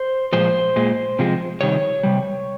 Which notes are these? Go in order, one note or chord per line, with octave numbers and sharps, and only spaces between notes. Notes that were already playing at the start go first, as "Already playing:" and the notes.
Already playing: C5
A#2 F3 G#3 C5
A#2 G#3
C3 F3 G#3
C3 D#3 G3 C#5
C3 G3